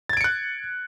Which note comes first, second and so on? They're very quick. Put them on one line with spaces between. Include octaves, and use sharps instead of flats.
A6 G#6 D7 C#7 F#6